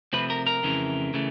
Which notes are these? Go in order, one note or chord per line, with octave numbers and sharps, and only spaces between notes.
C3 F3 A3 C4 B4
A#4
A#4
F2 C#3 E3 A3 C4
C#3 E3 A3